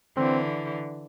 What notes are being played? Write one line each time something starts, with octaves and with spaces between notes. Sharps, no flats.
D3 E3 C4